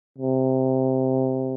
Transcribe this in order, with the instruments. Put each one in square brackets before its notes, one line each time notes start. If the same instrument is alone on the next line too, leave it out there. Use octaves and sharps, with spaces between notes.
[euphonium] C3